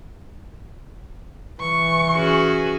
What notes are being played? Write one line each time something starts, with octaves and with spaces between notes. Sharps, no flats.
E3 C#6
C#4 F#4 G#4